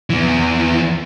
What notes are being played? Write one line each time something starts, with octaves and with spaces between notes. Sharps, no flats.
E2 E3